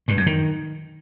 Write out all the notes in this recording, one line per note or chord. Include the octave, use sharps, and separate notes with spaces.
G2
F#2
D#3